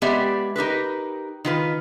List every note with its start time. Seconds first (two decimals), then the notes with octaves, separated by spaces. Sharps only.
0.02 G#3 B3 G4 D5 E5
0.56 D#4 G4 A#4 B4
1.45 D#3 F4 B4